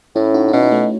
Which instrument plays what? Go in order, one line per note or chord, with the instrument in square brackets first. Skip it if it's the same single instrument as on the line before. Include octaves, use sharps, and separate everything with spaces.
[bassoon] A2 [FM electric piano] C#4 E4
[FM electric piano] D#4 F#4
D#4
[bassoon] B2 [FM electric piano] C#4 E4
[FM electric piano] D#4
A3 C#4